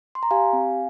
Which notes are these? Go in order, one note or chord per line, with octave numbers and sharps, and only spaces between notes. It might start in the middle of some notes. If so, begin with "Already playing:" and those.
C6
A#5
G4 F5 G#5
C4